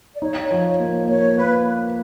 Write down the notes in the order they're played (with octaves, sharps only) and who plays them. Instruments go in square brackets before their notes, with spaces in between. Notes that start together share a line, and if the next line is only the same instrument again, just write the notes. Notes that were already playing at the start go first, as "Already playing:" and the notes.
[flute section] D5
[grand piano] D#4 [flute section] C#5
[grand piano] F3
A#3
[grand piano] A#3 [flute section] C#5
[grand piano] A#3 [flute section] B4